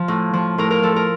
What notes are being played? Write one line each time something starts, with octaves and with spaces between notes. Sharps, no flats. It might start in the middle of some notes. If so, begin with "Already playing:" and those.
Already playing: F3
A2
F3
A2 A#4
A#4
F3 A4
A#4